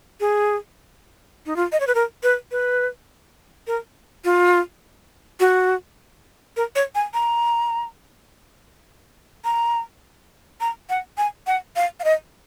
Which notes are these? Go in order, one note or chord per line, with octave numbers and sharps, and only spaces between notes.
G#4
D#4
F4
D#5
C#5
B4
A#4
B4
B4
A#4
F4
F#4
A#4
C#5
G#5
A#5
A#5
A#5
F#5
G#5
F#5
F5
F5
D#5